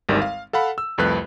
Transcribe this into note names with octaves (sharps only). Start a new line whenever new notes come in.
G#1 D2 D#3 G3
F5
A4 F5 F#5 B5
E6
C2 F2 A3 B4 F#6